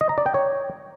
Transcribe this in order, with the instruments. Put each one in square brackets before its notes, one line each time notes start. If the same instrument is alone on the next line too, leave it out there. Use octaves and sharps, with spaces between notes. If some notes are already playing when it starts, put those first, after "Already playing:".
[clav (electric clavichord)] D#5
A#5
D5
G5
C#5